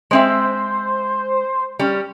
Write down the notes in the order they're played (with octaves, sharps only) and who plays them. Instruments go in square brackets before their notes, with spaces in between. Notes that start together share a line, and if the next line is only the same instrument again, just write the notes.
[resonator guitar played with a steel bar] G#3 C4 E5 [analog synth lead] C5
[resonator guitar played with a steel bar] G3 C#4